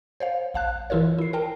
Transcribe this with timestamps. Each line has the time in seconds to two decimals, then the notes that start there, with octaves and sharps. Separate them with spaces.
0.20 C5 C#5 F5
0.54 A#1 F5 A5 F#6
0.90 E3 E4 F4 A#4 C#5
1.18 E4 C7
1.33 A#4 G5 A5